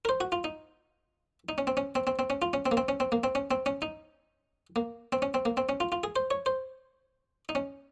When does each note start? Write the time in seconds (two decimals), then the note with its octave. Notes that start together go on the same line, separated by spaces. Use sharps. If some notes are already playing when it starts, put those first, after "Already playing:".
0.05 A#4
0.09 C5
0.20 F#4
0.32 F4
0.44 D#4
1.49 D#4
1.58 C#4
1.67 C4
1.77 C#4
1.95 C4
2.07 C4
2.19 C4
2.30 C#4
2.42 F4
2.53 C#4
2.66 C4
2.71 A#3
2.77 C4
2.88 C#4
3.00 C4
3.12 A#3
3.24 C4
3.35 C#4
3.51 C4
3.66 C#4
3.82 D#4
4.76 A#3
5.12 C4
5.22 C#4
5.34 C4
5.45 A#3
5.57 C4
5.69 C#4
5.80 F4
5.92 F4
6.04 G#4
6.16 C5
6.31 C#5
6.46 C5
7.49 D#4
7.55 C#4